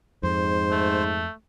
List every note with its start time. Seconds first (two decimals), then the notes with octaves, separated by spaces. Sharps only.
0.23 F2 G#2 C5
0.71 A3